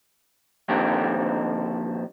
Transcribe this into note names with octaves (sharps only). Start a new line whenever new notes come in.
F2 A#2 D3 D#3 C4 G4